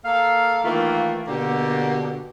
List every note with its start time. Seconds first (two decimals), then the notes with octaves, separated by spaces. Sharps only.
0.05 A#3 A4 F5
0.63 D#3 E3 A3 A#3 F4
1.27 B2 D3 A#3 G4 A4